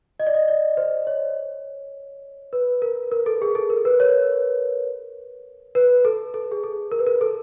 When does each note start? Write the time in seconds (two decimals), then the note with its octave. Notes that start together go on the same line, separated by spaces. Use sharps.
0.20 D#5
0.27 D5
0.34 D#5
0.48 D5
0.77 C5
1.07 C#5
2.53 B4
2.82 A#4
3.12 A#4
3.26 A4
3.42 G#4
3.55 A4
3.70 A#4
3.85 B4
4.00 C#5
5.75 B4
6.05 A4
6.34 A4
6.52 G#4
6.63 A4
6.92 A#4
6.99 B4
7.06 A#4
7.21 A4